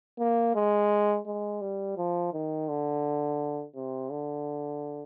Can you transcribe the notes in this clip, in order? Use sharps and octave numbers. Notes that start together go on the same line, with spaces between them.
A#3
G#3
G#3
G3
F3
D#3
D3
C3
D3